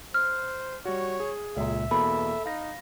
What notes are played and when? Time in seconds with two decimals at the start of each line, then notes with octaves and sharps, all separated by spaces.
0.14 C5 F6
0.85 G3 F#4 C#5
1.20 G#4
1.57 C#2 A#2 E5
1.91 E2 B2 A#3 A4 B5
2.46 D#4 F5 A#6